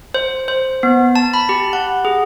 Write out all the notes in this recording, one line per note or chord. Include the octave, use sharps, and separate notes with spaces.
C5
C5
B3
A5
B5
G4
F#5
G#4